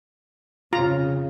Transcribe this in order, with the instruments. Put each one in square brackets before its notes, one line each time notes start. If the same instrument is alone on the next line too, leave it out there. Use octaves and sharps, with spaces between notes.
[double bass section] F2 C#3 [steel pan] F4 A#5